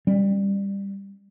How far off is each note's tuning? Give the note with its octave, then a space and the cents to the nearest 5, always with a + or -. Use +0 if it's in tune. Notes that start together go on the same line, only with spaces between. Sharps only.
G3 +15 C#4 -35